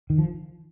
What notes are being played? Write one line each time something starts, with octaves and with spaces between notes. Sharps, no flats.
D#3
F3